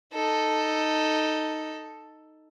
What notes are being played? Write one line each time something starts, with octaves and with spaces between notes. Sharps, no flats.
D#4 A4